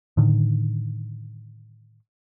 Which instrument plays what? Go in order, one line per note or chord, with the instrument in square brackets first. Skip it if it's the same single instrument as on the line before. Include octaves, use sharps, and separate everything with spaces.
[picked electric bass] A2 D3 D#3